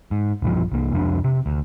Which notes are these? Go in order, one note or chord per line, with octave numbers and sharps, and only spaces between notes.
G#2
E1 A#1 G2 F3
C2 A#3
C2 F2 C#4 D4
C3
D2